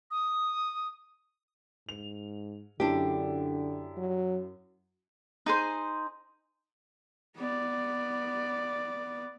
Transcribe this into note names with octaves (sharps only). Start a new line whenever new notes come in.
D#6
G#2 F7
F#2 D3 D4 E4 G4
F#3
D#4 G#4 C5
B3 D5